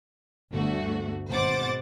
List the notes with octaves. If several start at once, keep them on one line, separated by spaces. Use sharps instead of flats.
G1 D2 A3 F#4
G#1 B2 C5 F#5 D6 A6